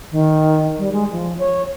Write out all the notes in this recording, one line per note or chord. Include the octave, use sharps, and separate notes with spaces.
D#3
G3
G#3
F3
C#5